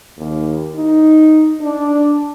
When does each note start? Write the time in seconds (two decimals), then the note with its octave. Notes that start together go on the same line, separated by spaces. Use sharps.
0.17 D#2
0.76 D#4
1.61 D4